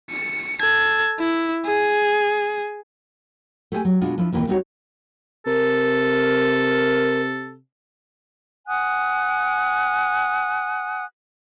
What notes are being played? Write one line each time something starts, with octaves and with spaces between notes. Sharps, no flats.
C#7
A4 G#6
E4
G#4
A3 G4 G#4 C5 G5 G#5
F#3
B2 G#3 D4 F4 F#4
F3 D4 E4
D#2 A#2 E3 A#3 C4 G5
G3 C4 D#4 F4 F#4 C#5
C3 A4 A#4
F#5 G#5 D#6 F#6